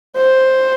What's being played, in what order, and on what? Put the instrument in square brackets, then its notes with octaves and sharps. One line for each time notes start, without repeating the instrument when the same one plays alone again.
[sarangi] C5